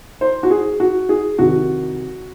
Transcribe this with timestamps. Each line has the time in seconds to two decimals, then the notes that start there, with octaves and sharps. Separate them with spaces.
0.21 C5
0.43 F#4
0.51 G#4
0.80 F#4
1.09 G#4
1.39 C2 C3 D#3 F#4